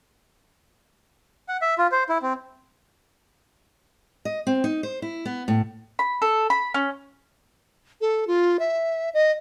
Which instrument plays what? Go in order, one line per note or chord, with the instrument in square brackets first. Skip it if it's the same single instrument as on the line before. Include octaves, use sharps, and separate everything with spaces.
[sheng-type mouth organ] F#5
E5
F4
C5
E4
C4
[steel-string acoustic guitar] D#5
C4
D#4
C5
E4
B3
A2
[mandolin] B5
A4
B5
C#4
[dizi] A4
F4
E5
D#5